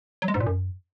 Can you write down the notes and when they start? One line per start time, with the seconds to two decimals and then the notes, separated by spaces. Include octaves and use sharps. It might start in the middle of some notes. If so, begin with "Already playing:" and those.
0.22 F#3
0.28 G#3
0.34 G#2
0.40 A#2
0.46 F#2